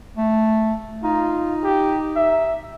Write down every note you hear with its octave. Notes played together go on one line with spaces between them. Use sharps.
A3
D#4 F4
G4
E5